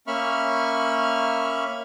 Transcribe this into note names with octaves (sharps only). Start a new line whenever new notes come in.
A#3 C#4 E5 B5 C#6 F6